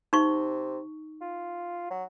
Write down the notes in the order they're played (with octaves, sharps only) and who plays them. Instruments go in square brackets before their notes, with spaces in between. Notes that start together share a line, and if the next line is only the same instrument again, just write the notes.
[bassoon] C3 [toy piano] D#4 C#6
[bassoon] F4
F#3